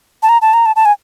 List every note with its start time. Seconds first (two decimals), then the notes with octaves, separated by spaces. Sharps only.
0.23 A5
0.29 A#5
0.42 A5
0.53 A#5
0.66 A5
0.76 A5
0.85 G#5